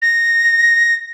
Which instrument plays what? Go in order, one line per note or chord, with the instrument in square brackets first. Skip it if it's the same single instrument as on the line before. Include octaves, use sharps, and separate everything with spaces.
[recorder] A#6